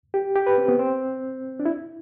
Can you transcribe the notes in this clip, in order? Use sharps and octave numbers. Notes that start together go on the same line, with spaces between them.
G4
G4
B4
C4
B3
C4
D4
E4